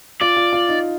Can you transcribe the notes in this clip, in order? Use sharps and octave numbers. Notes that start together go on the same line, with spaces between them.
F4 D5
F4
F4
D#4